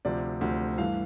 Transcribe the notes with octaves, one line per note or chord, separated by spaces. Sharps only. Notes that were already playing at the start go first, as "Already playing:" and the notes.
D2 C3 F3 D5
D2 C3 F3
G2 E3 A3 F5